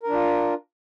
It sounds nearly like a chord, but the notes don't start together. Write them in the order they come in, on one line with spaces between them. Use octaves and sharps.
A#4 D4 F4